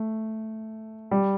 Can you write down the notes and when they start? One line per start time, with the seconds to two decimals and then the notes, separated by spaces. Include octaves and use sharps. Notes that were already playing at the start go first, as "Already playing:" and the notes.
Already playing: A3
1.11 G3